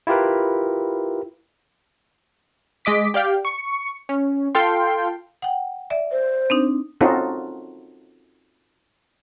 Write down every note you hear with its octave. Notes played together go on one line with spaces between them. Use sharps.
E4 F4 G4 A#4 B4
G#3 D#5 D6 B6
G4 D5 F5 G5
C#6 C#7
C#4
F4 A4 F5 G5 C6
F#5 G5
D5 E5
C5
C4 D4 D#4
C4 C#4 D#4 F4 F#4 A4